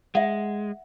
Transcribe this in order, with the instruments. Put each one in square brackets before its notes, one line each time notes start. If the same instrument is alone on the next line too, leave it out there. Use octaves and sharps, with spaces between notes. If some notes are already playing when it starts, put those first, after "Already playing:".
[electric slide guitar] G#3 [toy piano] E5 F#5